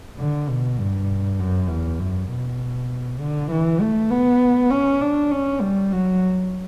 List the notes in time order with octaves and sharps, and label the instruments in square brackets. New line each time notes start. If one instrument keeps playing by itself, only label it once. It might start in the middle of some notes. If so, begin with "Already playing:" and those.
[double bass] D3
B2
G2
F#2
E2
F#2
B2
D3
E3
A3
B3
C#4
D4
C#4
G3
F#3